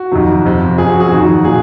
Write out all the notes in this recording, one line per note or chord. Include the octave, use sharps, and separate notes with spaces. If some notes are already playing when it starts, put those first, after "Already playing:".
Already playing: F#4
F2 C3 D#3 F#3
F2 C3 F3
F#2 F3 G#4
F#4
G#4
F2 D#3 F#3 F#4
A#2 F#3 G#4